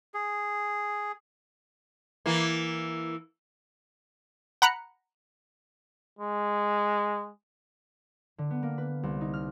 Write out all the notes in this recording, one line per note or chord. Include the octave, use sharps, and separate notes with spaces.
G#4
E3 A#3
F#5 A#5 B5 F#6 C#7
G#3
D3
B3
A#3
B4
C2
D#4
F6